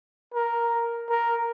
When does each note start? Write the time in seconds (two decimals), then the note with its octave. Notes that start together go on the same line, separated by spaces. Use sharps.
0.34 A#4
1.09 A#4